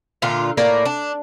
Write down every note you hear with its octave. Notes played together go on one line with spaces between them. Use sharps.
A#2 D3 F4
A2 A#3 A#4 D5
D4